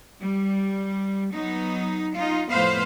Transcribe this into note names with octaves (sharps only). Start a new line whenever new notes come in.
G3
F#3 B3 D#4
D#4 F4
F2 A2 B3 B4 C5 F5